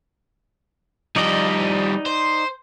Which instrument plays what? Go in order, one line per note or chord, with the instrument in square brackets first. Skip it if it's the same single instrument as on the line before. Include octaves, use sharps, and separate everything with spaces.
[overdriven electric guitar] F3 G3 [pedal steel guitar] D#4 D5 D#5
[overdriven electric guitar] C5